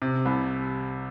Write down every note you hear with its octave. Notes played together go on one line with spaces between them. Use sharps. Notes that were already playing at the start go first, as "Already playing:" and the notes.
C3
C2